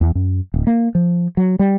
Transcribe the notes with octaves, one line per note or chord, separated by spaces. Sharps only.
E2
F#2
D1
A#3
F3
F#3
G3